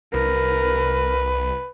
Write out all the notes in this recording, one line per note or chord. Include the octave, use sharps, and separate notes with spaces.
C2 A#4 B4